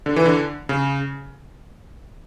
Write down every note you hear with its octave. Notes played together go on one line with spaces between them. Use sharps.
D3
E3
D3
C#3